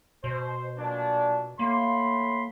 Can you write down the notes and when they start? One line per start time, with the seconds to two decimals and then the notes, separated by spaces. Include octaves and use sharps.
0.24 B2 C5
0.78 A#2 F#3 D4
1.59 A2 A#3 B5 C6